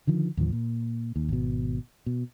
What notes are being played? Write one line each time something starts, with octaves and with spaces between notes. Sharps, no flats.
D3 D#3 F3
D#2 A2 D3 F3
A#2
D#2
G#1 B2
B2